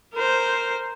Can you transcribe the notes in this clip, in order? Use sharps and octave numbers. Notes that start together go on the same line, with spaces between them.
A#4 C5